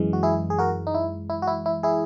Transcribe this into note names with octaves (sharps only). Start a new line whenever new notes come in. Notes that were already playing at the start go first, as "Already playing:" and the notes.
Already playing: F#2 E3 G#3
F#4
E4 G#4
G#4
F#4 A#4
D#4
E4
E4
F#4
E4
E4
E4 G#4